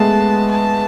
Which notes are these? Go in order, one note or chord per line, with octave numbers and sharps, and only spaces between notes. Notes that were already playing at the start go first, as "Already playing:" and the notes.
Already playing: G#3 A3 B3 A5
A5